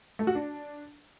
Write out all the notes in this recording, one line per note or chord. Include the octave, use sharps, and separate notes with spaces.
A3
F#4
D4